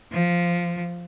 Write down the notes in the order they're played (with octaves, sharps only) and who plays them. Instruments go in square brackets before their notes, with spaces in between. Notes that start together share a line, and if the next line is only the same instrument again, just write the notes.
[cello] F3